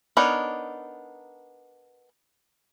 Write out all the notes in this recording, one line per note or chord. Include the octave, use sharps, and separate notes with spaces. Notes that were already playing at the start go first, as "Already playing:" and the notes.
B3 D4 D#4 A#4 C#5